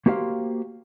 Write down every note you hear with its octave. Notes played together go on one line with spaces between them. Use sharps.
A#3 F#4 G4 C5 E5 F5